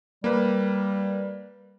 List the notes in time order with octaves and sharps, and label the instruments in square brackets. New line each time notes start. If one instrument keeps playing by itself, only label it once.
[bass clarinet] G3 [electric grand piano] A#3 B4